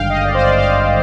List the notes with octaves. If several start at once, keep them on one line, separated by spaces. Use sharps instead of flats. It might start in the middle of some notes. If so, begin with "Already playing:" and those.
Already playing: G#1 G2 D3 F5 G5
D#5
D5
C5
D5
F5